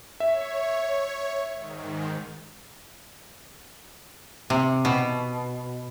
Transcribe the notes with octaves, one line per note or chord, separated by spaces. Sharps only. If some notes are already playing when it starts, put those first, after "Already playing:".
C#5 E5
G#2 D#3
C3
B2